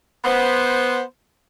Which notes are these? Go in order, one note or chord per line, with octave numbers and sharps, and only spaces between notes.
B3 C5